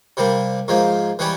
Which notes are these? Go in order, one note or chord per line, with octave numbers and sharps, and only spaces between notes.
C3 G3 A#3
G#2 F3 A#3
E3 G3 C#4 G4